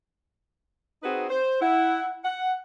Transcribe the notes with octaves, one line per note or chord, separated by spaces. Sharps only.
C4 D#4 F#4 G#4 B4
C5
E4 F#5
F#5